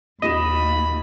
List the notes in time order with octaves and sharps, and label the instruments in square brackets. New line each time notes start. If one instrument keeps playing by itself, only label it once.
[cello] D#2 A#3 [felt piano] A#2 F#4 E7 [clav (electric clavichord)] D#5 [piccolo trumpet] B5